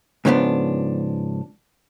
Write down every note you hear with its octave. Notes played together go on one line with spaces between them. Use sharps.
G#2 C#3 F3 B3 D4